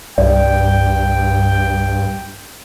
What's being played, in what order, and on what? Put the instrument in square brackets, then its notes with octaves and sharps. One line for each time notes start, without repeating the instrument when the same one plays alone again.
[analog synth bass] C2 [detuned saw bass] G2 [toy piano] D5 [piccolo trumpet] G5